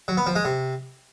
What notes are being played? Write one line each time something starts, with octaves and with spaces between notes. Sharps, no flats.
F#3
B3
F3
G#3
C3